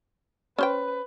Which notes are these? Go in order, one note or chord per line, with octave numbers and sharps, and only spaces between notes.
C#4 B4 C5 G5